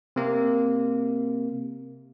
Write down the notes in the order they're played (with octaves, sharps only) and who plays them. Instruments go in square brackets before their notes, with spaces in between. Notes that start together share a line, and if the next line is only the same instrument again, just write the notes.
[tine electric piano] C3 A#3